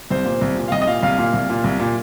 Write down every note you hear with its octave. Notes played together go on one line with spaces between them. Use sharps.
C2 C5
A#2
C2
A#2
F5
C2 D#5
D#5
A#2 F5
C2 F5
A#2
C2
A#2
C2
A#2